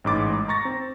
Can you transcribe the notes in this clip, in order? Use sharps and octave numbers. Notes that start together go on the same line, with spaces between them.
A1 G#2 D6 A6
A#5 C#6 A6 A#6
C4